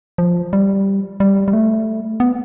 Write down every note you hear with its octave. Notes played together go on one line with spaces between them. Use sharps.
F3
G3
G3
G3
A3
B3